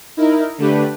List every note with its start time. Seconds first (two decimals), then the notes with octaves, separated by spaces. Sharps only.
0.17 D#4 E4 A#4
0.58 D3 A3 D4 G4 B4